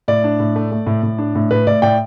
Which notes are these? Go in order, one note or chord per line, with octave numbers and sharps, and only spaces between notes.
A2 D5
D4
A2
A3
A3
A2
A2
D4
A2
A2 B4
A2 D5
A2 D5 G5